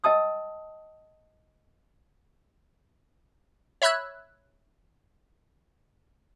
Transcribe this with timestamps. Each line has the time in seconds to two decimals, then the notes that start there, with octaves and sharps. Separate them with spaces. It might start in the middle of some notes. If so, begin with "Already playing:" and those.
0.04 D#5 G5 A5 D#6 E6
3.82 C#5 E5 B5 E6 F#6 G#6